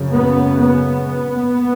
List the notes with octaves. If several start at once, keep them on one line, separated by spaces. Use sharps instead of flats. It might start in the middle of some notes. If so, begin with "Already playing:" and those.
Already playing: F#2 C#3
B3
B3